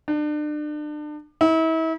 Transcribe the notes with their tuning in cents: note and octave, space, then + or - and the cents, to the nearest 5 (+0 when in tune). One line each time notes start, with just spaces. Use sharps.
D4 +35
E4 -35